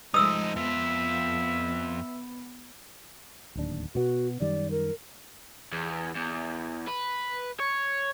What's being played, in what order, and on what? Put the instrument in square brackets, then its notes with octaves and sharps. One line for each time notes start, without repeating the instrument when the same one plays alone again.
[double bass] F3 G#3 [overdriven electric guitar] A3 D#4 [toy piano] D#6 E6
[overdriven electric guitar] F2 F4 [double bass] B3 [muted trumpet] E5
[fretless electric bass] D1 D#2 D4
[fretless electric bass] B2 B3 [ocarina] F#4
[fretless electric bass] F#2 D#3 G3 [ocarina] D5
[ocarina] A#4
[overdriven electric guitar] E2
E2
B4
C#5